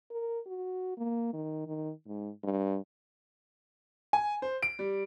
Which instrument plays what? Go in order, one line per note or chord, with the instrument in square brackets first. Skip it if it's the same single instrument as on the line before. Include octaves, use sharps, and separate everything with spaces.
[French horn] A#4
F#4
A#3
D#3
D#3
G#2
G2
[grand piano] G#5
C5
D7
G3